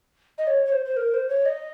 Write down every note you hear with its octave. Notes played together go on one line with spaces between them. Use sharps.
D#5
C#5
C#5
C5
C5
A#4
C5
C#5
D#5